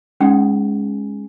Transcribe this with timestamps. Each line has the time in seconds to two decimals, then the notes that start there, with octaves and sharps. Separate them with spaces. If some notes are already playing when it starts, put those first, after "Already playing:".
0.20 G#3 C#4 D#4 F#5